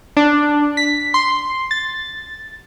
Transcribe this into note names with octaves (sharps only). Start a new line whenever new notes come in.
D4
B6
C6
A6